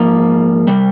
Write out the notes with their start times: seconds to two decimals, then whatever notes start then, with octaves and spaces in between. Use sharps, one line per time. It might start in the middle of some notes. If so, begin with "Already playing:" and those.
Already playing: G#2 F3 A#3
0.67 C3 G3